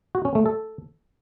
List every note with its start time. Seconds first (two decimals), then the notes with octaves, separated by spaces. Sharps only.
0.15 F#4
0.25 C#4
0.35 A3
0.46 A4